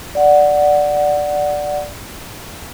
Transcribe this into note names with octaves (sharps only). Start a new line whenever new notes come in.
D5 F#5